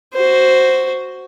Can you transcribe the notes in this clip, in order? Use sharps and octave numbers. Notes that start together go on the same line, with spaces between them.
F#4 C5